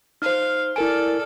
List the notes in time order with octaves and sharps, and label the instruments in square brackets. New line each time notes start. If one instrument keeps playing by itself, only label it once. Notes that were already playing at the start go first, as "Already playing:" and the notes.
[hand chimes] D#4 C5 [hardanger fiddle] F5 [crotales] F6
[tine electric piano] E4 A#4 G#5 [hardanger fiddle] A4 D5 [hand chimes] D7